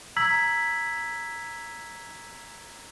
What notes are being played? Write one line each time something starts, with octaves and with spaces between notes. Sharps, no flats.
A#5 E6 G#6 B6 F#7